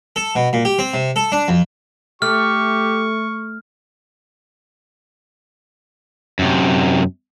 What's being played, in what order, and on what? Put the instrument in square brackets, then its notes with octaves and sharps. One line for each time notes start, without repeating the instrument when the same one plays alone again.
[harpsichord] A4
B2
A#2
G4
C4
C3
A4
D4
F2
[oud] A3 [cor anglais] G4 [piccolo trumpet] C#6 [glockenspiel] F6
[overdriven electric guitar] F#2 C3